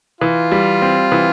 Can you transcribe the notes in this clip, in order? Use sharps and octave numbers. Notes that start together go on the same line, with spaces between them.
E3 F4
G3
C4
E3